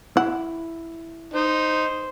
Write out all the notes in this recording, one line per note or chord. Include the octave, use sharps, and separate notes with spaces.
E4 F#5
D#4 C5